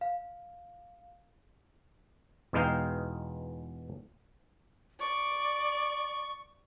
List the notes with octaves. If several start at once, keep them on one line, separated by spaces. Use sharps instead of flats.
F5
E2 B2 G#3 D#4 F5 G5
D5 C#6